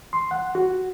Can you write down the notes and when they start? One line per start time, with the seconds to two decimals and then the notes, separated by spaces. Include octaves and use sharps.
0.13 C6
0.31 F#5
0.55 F#4